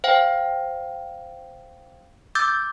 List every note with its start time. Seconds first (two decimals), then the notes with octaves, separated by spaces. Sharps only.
0.04 C5 F5 G5
2.35 D6 E6 G6 A6